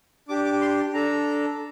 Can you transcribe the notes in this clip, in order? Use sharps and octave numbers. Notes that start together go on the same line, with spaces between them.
D4 G4 D6
D6
C6
D4 A4 A#5